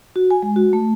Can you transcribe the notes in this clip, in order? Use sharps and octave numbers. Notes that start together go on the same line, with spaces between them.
F#4
G#5
G#3
F#4
A3